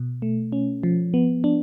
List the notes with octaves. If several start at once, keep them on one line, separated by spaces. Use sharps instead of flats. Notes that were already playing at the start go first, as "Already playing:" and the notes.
Already playing: B2
A3
C#4
F3
B3
D4